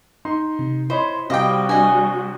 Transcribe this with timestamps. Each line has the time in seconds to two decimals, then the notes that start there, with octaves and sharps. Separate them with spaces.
0.25 D#4 C6
0.59 C3
0.90 E4 C5 C#5 D#5 B5 C6
1.30 C3 G3 F#4 D#5 F5 G5 D6
1.69 D4 D#5 G#5